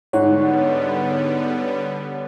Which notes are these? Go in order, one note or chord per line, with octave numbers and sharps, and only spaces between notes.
G#2 D3 G3 B3 C#5 F#5